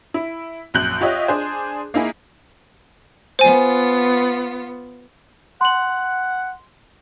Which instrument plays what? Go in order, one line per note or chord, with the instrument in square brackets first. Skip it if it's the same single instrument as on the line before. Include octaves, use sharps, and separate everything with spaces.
[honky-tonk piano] E4
A#1 F#2 F#6 G6 F#7
F4 G4 C#5 D#5 E5
D4 G#4 C5
A#3 D#4 E4 G#4
[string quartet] B3 F4 [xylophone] C5 G#5
[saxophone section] F#5 [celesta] C6 F#7